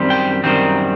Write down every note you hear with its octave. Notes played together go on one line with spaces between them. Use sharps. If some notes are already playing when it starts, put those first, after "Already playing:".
Already playing: F#2 D#3 G3 C4
G5
F#2 D#3 G3 C4